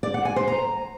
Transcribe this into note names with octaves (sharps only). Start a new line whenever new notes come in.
D5
F#5
G#5
C5
A#5